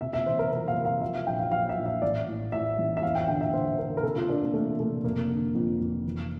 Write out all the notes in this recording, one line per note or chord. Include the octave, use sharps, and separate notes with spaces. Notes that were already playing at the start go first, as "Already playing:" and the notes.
C3 E5
E5
E3 C5
A#4
C3 A#4
F5
C3
F5
F3 E5
F5
A#1 G5
F5
F3 F5
E5
A#1
E5
A1 D5
A2
A2 E5
A1
E5
E2 F5
G5
D3 G5
E5
D3 C5
D3 A#4
A#4
C3 A4
F4
C3 D4
A#3
E3 A3
C3 A3
F1 A#3
D3
F2
F1
E3